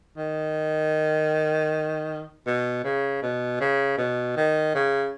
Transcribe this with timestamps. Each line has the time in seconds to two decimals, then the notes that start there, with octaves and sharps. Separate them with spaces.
0.17 D#3
2.46 B2
2.84 C#3
3.23 B2
3.61 C#3
3.97 B2
4.36 D#3
4.74 C#3